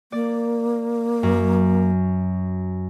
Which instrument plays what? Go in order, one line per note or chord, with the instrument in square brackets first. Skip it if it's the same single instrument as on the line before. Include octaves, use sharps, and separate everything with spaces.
[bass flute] A#3 [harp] D5
[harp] F#2